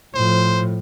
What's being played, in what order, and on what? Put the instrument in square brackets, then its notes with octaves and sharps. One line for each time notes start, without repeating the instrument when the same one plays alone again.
[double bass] A2 F3 [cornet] C5